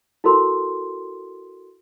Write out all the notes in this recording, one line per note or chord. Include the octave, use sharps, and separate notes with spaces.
E4 F#4 A4 A#4 C6